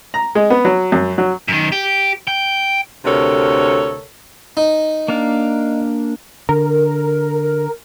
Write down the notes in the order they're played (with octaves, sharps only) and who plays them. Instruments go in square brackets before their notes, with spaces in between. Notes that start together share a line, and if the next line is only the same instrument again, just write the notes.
[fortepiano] A#5
G#3
B3
F#3
F#2
F#3
[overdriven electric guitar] F#2 D#3
G4
G5
[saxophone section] D2 C3 A4 A#4 C#5
[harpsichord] D#4
[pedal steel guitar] A#3 D4 F5
[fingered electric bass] D3 [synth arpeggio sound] A#4